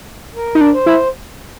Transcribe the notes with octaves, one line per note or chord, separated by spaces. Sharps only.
A#4
D#4
D4
C5
E4